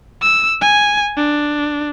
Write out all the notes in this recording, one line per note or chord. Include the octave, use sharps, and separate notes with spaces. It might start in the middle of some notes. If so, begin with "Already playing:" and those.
E6
G#5
D4